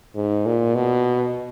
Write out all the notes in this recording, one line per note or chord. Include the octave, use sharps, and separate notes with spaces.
G#2
A#2
B2